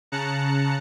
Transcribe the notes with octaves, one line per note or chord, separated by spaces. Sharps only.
C#3 A5 A#5 F#6 C#7